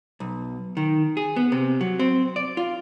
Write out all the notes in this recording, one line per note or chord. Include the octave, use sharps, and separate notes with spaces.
B1
D#3
G#4
B3
C3
F#3
C4
D5
F4